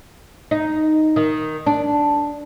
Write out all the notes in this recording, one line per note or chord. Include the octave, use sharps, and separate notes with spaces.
D#4
D#3
D4